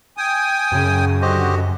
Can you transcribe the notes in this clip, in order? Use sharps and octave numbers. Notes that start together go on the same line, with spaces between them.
G5 G#5 D#6
F#2 C#3
D3 F#4 G4 C5 D#5